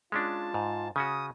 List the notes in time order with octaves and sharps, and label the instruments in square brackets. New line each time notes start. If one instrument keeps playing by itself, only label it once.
[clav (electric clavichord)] G#3 C#4 D4 [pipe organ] F4 A5
[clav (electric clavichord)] G#2
[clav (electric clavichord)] C#3 C#4 F#4 [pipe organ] D#6